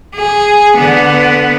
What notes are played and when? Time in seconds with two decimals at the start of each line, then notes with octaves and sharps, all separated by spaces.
0.15 G#4
0.77 D3 B3